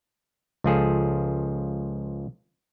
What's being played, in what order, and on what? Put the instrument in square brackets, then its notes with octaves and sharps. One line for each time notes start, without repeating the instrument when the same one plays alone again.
[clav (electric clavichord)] C#2 F3 G#4 A4